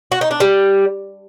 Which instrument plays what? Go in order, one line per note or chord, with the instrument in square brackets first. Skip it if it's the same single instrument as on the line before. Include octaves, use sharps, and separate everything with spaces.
[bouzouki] F#4
D#4
D4
G3